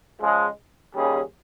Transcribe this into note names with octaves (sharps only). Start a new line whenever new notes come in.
C#3 F3 G#3
D#2 C#3 G3 C#4 G#4